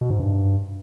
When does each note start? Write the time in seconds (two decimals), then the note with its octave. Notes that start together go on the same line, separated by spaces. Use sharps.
0.01 B2
0.10 G#2
0.19 G2